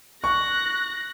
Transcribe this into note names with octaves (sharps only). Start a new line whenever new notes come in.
C#6 F#6 A#6